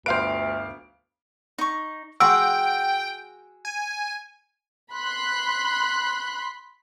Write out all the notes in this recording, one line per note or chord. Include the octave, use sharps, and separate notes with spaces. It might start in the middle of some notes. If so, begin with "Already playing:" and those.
G1 D2 B4 C5 F5 D7
D#4 C#6
F#4 G#4 F#5 G5 C6 E6
G#5
B5 C6 F#6